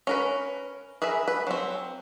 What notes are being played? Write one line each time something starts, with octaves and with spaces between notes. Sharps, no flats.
C#4 A#4 B4
G#4 A#4 B4 E5
B4
F#3 C4